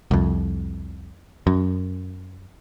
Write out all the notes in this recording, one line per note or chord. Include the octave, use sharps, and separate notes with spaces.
C2 F2
F#2